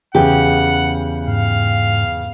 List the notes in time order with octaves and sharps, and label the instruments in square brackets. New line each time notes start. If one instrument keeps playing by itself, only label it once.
[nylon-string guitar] E2 G4 [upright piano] C#3 G5 [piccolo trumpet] F#5
[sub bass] G#2 [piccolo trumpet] F5